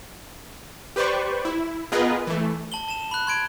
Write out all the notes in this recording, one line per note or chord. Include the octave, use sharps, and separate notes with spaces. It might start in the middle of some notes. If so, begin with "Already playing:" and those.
G4 B4 C5 D5 C#6
E4
B3 F4 G#4 A#4 B4 D#5
E3 A3
A5 F#7 G7
A5 E7
B5 F#6
C6 G#6 D7